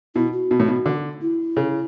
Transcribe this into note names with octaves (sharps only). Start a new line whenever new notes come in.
B2 E4
F#4
B2
A2
B2
D3
E4
C#3